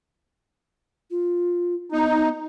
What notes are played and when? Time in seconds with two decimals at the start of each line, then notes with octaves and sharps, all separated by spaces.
1.11 F4
1.92 B3 D#4